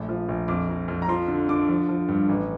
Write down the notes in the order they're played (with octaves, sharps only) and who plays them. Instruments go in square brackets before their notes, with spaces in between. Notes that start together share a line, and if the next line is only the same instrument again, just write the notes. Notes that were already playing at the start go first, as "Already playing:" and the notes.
Already playing: [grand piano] A#1 A3
F3
A#1
F2 D6
F2
F2
A#5
F3 C6
D3
D3 D6
F3
F3
G2
A1